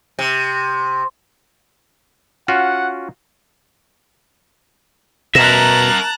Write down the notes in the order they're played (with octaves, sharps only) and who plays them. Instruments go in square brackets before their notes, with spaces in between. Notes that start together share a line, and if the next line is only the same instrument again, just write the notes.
[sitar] C3
[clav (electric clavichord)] C#4 F4 F#4 [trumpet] F#5
[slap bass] B2 [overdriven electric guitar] A#4 E5 [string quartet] A5 A#5 F#6 [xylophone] A#6 E7